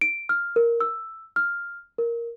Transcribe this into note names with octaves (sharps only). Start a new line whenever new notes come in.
D7
F6
A#4
E6
F6
A#4